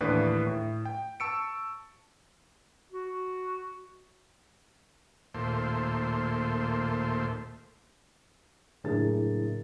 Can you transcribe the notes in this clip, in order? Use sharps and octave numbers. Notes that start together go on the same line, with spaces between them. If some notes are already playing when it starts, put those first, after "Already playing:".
D#2 A2 E3 D4 B4
A2
G5
A5 C#6 E6 C#7 D7
F#4
D#2 A#2 A3 C5
F#1 A2 D4 G#4 A#4 A6